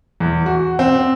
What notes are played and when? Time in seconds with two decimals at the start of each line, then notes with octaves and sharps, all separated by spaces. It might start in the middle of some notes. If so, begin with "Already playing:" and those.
0.20 E2
0.46 F#4
0.79 C4